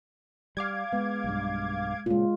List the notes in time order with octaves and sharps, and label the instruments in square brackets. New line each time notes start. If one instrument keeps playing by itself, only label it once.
[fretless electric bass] G3 [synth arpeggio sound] F5 D6 G#6
[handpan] G#3 [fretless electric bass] B3
[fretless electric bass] B1 G2
[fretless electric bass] A#2 C#3 [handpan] G#3 F4